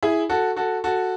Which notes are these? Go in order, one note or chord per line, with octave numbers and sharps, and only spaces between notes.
E4 G#4
F#4 A4
F#4 A4
F#4 A4